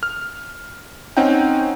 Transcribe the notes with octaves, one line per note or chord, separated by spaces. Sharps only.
F6
C4 C#4 D#4 F#5 G5